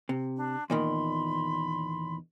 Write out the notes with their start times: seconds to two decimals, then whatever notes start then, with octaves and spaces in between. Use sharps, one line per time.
0.09 C3
0.36 D4
0.70 E2 A#2 D#3 B5 C6